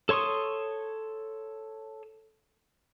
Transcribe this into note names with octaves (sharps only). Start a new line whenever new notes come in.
A4 C#5 C6 C#6 D#6